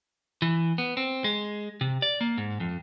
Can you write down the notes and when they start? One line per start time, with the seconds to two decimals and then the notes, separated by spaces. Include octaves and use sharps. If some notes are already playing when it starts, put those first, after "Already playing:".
0.42 E3
0.78 B3
0.97 C4
1.24 G#3
1.81 C3
2.02 D5
2.21 A#3
2.38 G#2
2.60 F2